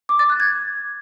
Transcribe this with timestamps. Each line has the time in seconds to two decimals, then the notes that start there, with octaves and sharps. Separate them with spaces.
0.09 D6
0.19 A6
0.30 F#6
0.40 G#6